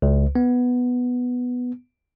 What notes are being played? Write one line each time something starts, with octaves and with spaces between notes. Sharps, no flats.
C#2
B3